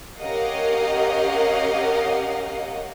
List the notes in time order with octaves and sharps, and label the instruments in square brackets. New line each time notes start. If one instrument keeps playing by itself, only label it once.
[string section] C#4 G4 A#4 D#5 F5 F#5